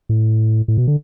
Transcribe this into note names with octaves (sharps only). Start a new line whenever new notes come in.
A2
A2
B2
D3